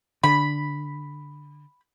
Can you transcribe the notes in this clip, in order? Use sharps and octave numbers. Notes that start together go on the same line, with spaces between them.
D3 B5